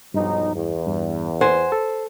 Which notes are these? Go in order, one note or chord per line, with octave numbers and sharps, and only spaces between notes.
B1 G2 F3 D#4
E2
G2
C5 F#5 G#5 C6
A4